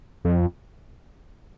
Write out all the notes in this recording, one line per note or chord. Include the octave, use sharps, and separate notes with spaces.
F2